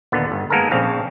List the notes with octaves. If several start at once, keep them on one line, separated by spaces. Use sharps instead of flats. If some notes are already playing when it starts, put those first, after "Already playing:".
D#2 A#2 D3 B3
G1
G#3 A#3 B3 D#4 A4 A#4
A#1 C#3 C4 A4 F5